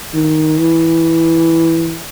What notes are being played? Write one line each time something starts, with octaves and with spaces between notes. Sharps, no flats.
D#3
E3